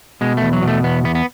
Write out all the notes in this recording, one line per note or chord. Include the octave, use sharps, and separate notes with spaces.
B2 G#3
A3
E2
F#3
B2
A3
E2 B3
E2 B3
B3